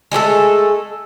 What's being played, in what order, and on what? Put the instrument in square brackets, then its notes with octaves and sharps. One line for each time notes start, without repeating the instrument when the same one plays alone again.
[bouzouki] G#3 A3 G4 A4